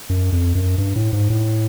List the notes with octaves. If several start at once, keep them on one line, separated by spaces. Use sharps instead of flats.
F#2
F2
F#2
G2
A2
G#2
A2